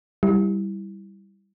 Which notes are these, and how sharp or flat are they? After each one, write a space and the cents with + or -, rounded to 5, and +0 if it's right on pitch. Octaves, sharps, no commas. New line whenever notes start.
G3 +0 E4 -5